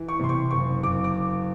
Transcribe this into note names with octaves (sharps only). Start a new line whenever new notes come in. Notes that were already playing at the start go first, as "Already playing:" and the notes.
Already playing: E3
C#6
C3 C6
C#6
F#1 C#6
F#1 D6
D6